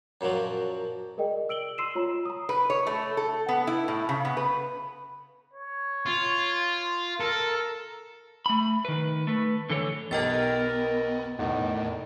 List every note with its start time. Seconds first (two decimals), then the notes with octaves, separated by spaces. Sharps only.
0.21 F#2 A#2 F3 F#3
1.17 G#4 A#4 D5 D#5 G5
1.49 E6 D7 F#7 G7
1.78 C6 E6 C7 D#7 E7
1.95 F4 C#5 A#5
2.25 A#5 D#6
2.49 B4
2.70 C#5
2.87 A3
3.17 A4
3.49 B3
3.67 E4
3.88 A2
4.09 C#3
4.25 B3
4.37 B4
5.54 C#5
6.06 F4
7.20 A4 A#4
8.46 A3 B5
8.85 D#3 B4
9.27 A3 B4
9.70 D3 E3 A4 C#5
10.11 B1 B3 G4 A#4 D#5 G5 A6
11.39 F1 E2 A2 D3 D#3